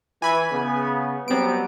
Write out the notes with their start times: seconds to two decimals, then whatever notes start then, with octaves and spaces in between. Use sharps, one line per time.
0.22 E3 G#5 B5 G#6
0.51 C#3 B3
1.28 F#3 G3 B3 C4 D7